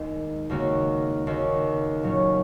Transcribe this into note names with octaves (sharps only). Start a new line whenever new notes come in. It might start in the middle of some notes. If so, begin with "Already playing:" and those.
Already playing: D#2 D#3 G#3
D#2 C#3 A#3 F#4
D#2 C#3 A#3 F#4
A#2 F#3 C#4